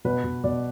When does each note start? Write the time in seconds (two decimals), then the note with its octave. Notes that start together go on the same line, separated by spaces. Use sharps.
0.05 B2 B4
0.24 B2
0.44 B2 D5